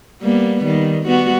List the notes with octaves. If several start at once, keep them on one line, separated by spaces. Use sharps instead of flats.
G3 A#3 B3
D#3 G3
G3 B3 F#4